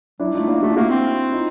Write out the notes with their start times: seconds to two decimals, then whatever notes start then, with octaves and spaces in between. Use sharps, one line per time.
0.20 F#3 D4 E4
0.30 G3
0.34 A3 D#4 F4
0.48 A#3 D4 E4
0.62 A3 E4 F#4
0.76 A#3 E4 F#4
0.90 C4
1.32 D#4 F4